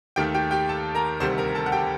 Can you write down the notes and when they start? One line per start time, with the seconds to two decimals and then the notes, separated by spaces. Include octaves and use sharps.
0.16 D#2 D#3 A3 G4 G5
0.35 G4 G5
0.51 G4 G5
0.69 A4 A5
0.95 A#4 A#5
1.20 D2 C3 D#3 G3 C5 C6
1.38 A#4 A#5
1.55 A4 A5
1.66 F#5
1.72 G4 G5